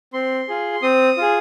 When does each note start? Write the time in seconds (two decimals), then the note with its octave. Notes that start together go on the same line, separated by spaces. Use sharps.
0.13 C4 C6
0.48 F4 G#4
0.82 C4 D#6
1.17 F4 G#4